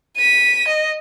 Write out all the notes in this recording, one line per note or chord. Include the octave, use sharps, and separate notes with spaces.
B6 D#7
D#5